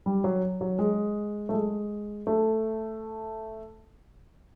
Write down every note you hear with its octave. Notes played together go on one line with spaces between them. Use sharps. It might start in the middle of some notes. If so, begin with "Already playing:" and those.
G3
F#3
F#3
G#3
A3
G#3
A3